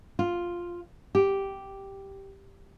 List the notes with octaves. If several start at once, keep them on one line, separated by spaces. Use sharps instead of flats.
F4
G4